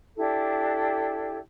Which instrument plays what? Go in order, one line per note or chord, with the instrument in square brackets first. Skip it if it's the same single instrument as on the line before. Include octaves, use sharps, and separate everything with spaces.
[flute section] D4 E4 G4 A4